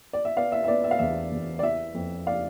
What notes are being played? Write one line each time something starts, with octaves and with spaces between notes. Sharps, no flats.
D5
E5
B3 D5 F5
E5
E5
B3 D5
E5
F5
E2 E5
E2
D5
E3 E5
F2
D5 F5